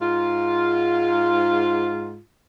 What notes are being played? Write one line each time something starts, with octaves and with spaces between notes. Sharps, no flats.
G#2 F4